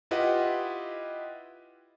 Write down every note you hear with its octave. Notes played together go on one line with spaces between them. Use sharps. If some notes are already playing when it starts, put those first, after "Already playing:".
E4 F4 G4 B4 D#5 F#5